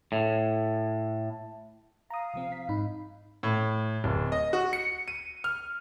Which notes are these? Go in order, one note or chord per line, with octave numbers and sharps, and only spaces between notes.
A2
F5 A#5 D#6
C3 F3 C4
B6
G#2 D#4 B5
A2
D1
D#5
F#4
C#7
D#7
F6